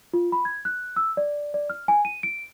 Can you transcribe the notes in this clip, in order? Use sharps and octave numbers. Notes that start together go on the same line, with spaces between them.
F4
B5
G#6
F#6
E6
D5
D5
F6
G#5
D#7
D7